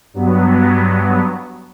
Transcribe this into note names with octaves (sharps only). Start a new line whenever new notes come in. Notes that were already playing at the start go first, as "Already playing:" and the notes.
G2 F#3 B3